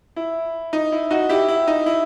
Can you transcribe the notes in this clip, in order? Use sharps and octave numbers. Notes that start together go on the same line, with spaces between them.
E4
D#4
E4
D#4 F#4
E4 G4
E4
D#4
E4